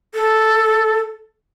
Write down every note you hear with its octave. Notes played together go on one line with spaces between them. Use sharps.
A4